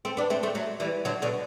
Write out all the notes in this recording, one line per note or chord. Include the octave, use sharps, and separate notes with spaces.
A3 C4
B3 D4
A3 C4
A3 C4
F#3 A3
E3 G3
D3 F#3
B2 D3